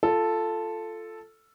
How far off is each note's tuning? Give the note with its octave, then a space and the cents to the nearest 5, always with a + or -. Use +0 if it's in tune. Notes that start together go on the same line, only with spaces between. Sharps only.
F4 -10 A4 +0